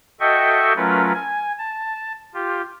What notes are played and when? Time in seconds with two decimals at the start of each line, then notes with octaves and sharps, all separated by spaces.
0.20 F#4 A4 D#5 E5 G5 C#6
0.76 F#3 A3 C#4 F4 A#4 B4
1.14 G#5
1.59 A5
2.34 F4 G4